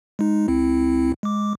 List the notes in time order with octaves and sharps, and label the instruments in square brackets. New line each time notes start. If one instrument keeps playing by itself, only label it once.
[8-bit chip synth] G#3 D#4
C#2 C4 E4
G#3 D6